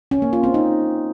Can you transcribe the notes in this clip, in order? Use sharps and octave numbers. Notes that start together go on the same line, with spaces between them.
C#4
A#3
F4
C4
D#4